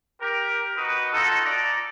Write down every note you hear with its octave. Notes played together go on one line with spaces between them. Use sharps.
G4 A#4
D#4 F#4 B4 D#5
D#4 F4 F#4 A4
D5 A#5